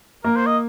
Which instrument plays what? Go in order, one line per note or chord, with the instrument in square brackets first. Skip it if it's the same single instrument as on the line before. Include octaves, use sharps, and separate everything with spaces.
[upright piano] A#3 [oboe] A#4
[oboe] C5
D#5